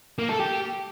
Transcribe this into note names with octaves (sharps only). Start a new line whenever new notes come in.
A#3
A4
G4